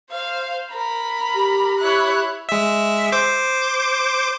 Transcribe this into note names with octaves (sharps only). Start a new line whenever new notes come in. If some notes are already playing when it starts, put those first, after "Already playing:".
C5 F5
A#4 B5
G4
E4 C#5 F#6
G#3 E5
C5 D6